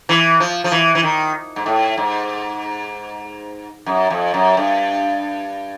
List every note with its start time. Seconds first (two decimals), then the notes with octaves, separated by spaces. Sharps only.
0.09 E3
0.40 F3
0.64 F3
0.72 E3
0.95 E3
1.03 D#3
1.56 G#2
1.66 A2
1.98 G#2
3.86 F#2
4.10 F2
4.34 F#2
4.57 G2